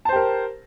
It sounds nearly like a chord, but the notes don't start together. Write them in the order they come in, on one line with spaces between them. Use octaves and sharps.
A5 C5 G4 A#4